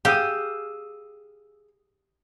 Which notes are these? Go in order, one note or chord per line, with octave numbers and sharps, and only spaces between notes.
G4 G#4 F5 D#6 E6